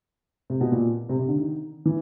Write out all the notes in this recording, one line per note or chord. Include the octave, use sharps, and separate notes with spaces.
C3
B2
A#2
C3
C3
D3
D#3
E3